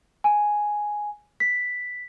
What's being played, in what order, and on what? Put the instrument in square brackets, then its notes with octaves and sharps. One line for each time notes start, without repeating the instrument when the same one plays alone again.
[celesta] G#5
B6